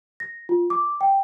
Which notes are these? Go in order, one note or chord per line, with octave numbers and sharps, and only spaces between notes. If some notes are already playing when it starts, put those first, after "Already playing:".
A#6
F4
D6
G5